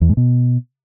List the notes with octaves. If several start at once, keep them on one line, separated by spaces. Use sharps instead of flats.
E2
G#2
B2